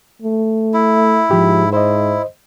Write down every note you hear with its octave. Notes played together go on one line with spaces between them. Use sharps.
A3
E4
G#2 F3 F4 G4
E4 C5 D#5